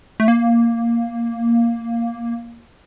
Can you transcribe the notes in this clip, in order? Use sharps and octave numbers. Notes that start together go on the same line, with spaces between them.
A3
A#3